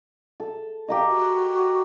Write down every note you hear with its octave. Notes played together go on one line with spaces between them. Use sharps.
A4
G4 A#4 D#5 F5
F#4